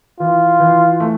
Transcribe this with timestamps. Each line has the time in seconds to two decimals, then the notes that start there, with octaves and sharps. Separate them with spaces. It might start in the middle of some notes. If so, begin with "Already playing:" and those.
0.19 E3 F4
0.60 E3
1.00 A3